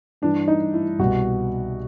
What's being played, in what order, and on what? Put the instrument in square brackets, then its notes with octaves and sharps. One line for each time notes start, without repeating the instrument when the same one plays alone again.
[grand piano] G2 E3 D4
D#4
E4
C2 B2 F#4